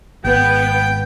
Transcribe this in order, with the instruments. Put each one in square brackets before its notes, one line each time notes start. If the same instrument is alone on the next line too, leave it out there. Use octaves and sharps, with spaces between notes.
[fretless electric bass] G#1 [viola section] B3 [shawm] G5